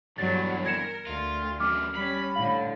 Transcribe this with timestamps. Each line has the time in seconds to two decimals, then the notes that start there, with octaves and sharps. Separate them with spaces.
0.18 E2 G2 D3 F#3 A6
0.66 A#4 G#6 C#7 E7
1.07 D2 F4
1.60 F#2 E3 D6 F6
1.95 G3 C#4 B5
2.36 A2 D3 F5